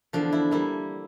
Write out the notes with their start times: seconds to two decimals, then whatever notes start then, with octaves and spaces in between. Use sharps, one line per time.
0.13 E2 D3 F3 D4
0.33 E4
0.51 G3 A#3 E4